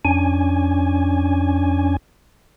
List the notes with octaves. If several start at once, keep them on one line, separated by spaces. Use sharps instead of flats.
F2 C#4 D4 G#5